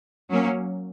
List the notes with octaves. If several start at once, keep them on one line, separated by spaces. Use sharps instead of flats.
F#3 A#3 C#4